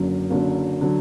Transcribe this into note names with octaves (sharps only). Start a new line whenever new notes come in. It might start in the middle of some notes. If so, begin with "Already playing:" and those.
Already playing: F#1 F#2 D3 F#3
F#1 F#2 D3 F#3
D3 F#3